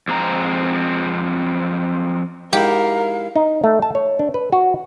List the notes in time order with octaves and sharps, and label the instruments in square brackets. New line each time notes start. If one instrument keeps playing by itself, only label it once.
[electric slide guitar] F2 G#3 C4 A#5
[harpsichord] G#2 E4 [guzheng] G4 [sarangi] A#4 [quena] F5
[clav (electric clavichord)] D#4
A3
A5
C#5
D4
B4
F#4